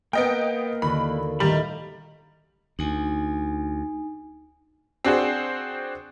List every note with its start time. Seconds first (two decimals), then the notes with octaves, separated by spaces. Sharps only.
0.13 A#3 B3 D#5 G5 A#6
0.82 D#2 D3 F#4 B5
1.40 A#2 D#3 G3 A3 A#5 B5
2.79 D2 D#4 G#5
5.05 C4 D4 F#4 G#4 C5